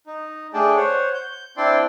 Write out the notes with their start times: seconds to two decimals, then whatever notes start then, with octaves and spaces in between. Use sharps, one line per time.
0.07 D#4
0.54 A3 D4 G#4 D5 G5 A5
0.76 C5 C#5 F#5
1.14 G6
1.57 C4 D4 E4 D5 G5 C6